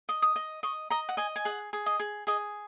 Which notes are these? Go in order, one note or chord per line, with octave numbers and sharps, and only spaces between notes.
D#5
D#6
D#5
D#5 C#6
D#5 A#5
F#5
D#5 G#5
G#5
G#4 F#5
G#4
D#5
G#4
G#4 D#5